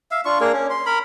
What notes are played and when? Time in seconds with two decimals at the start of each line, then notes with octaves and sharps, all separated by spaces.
0.11 E5 F5
0.25 D4 F4 C#6
0.40 A#3 D4 G#4 A#4
0.52 C#4
0.70 C6
0.86 A#4 B5